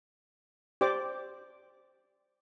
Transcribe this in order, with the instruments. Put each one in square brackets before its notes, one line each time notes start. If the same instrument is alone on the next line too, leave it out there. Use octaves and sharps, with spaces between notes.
[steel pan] G4 C5 D5 D6